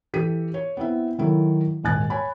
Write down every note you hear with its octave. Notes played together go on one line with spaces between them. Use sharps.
E3 G4 A4 B6 D#7
C#5
B3 C4 E4 E5
D#3 F#3 E4 A4
D#1 D#2 G#2 G#5 F#6 A6
C#5 G#5 B5